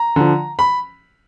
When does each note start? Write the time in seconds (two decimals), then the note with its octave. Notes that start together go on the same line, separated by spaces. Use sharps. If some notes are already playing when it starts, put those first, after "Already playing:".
Already playing: A#5
0.16 D3 F3
0.59 B5